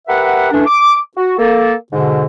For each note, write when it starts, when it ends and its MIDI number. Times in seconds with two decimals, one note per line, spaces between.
0.08 0.52 67
0.08 0.52 70
0.08 0.52 71
0.08 0.52 76
0.08 0.52 78
0.52 0.66 52
0.52 0.66 57
0.52 0.66 61
0.52 0.66 62
0.66 0.98 86
1.17 1.33 66
1.38 1.74 58
1.38 1.74 69
1.92 2.25 44
1.92 2.25 47
1.92 2.25 50